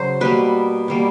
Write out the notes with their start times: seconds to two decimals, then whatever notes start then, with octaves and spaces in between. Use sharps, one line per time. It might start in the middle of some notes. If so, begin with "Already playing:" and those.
Already playing: C#3 F#3 C5
0.21 B2 G3 A#3 B4
0.88 B2 G3 A#3